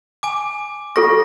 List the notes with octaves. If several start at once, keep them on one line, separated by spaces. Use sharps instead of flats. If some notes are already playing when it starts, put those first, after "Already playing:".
G#5 D6
F4 A4 C#6 A#6